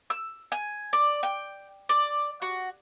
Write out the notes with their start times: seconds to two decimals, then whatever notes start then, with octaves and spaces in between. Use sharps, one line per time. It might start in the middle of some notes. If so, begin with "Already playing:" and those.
0.10 E6
0.52 G#5
0.93 D5
1.23 G5
1.89 D5
2.42 F#4